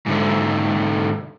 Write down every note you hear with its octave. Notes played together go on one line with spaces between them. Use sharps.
G#2 D3